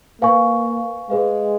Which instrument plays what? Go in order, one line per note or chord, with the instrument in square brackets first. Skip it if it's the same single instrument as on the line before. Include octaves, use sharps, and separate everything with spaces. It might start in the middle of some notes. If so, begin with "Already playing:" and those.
[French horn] A#3 [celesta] B4 F5 G#5 C#6
[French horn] G#3 [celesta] G#4 B4 F5